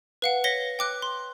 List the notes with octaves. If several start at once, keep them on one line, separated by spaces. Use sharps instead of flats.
B4 F5 F#5
C#5 A#6 B6 C#7 G7
G5 D6 F#6
C6